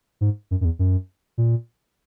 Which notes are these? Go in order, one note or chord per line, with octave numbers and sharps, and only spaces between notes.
G#2
F#2
F#2
E2
F#2
A#2